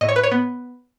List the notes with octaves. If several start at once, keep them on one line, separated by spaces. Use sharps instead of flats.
A2 D#5
C#5
B4
C#5
B3